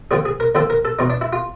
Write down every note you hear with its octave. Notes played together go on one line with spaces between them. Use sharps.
D#2 D3 F3 G#4
G#4
A#4
D#2 D3 F3 A4
A#4
A4
E2 B2 D#4
D4
E4
F4